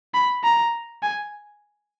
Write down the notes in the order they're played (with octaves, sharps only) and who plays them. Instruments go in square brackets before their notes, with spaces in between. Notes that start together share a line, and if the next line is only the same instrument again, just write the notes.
[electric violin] B5
A#5
G#5